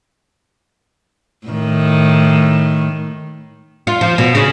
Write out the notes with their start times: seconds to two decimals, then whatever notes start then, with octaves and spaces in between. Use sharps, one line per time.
1.47 A2 D#3
3.87 F4
4.01 F3
4.18 B2
4.35 C#3